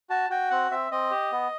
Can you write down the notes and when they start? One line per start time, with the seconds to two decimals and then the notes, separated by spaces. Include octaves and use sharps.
0.10 F#4 A5
0.30 F#4 G5
0.50 C4 F#5
0.71 C4 E5
0.91 C4 D#5
1.11 G4
1.32 B3